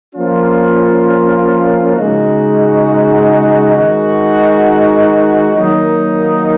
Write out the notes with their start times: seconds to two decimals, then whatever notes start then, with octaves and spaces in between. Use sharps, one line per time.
0.15 F3 A#3 C#4 F4
1.95 C#3 G#3 D#4 F#4
3.75 D#3 G#3 D#4 F#4
5.56 D#3 F#3 A#3 D#4